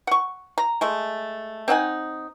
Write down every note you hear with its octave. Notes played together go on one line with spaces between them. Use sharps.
F#5 C#6
A#5
G#3 A3
C4 D#4 F#5 G#5